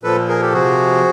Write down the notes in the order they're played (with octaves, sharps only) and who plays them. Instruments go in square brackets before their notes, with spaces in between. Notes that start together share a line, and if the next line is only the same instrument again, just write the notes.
[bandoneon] A#2 F3 A4 B4
G#4 A#4
G4 A4
C3 F3 F#4 G#4